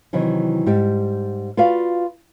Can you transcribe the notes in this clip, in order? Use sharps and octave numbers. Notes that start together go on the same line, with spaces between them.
C3 D#3 E3 F#3
G#2 G3 G4
F4 F#4 B4 D5 F5